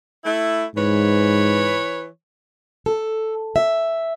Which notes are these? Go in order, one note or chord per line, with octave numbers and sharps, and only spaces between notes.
A3 E4
G#2 E3 B4 C#5
A4
E5